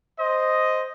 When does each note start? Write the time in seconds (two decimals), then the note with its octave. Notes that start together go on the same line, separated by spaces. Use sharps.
0.19 C5 D#5